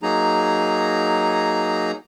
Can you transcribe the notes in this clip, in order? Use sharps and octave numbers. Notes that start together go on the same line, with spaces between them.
F#3 A#3 D#4 G#4 A#5